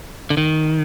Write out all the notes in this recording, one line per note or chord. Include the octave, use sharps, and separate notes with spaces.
D3
D#3